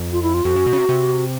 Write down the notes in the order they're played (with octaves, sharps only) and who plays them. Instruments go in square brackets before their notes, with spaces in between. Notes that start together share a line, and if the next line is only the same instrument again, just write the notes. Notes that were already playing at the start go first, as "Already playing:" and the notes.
Already playing: [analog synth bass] F2
[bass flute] F4
E4
F4
[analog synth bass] F2 [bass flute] F#4
[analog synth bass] F#2
B2
C#3
C3
C3